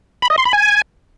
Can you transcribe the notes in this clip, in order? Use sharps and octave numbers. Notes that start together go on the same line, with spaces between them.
B5
D#5
C6
B5
G#5